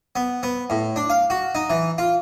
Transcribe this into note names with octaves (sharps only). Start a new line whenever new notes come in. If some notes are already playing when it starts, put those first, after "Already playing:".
B3
B3
A2
D4
F5
F#4
D#4
E3
F4